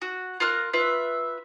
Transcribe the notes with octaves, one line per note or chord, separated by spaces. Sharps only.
F#4
F4 A#4 F6 F#6
F4 B4 E5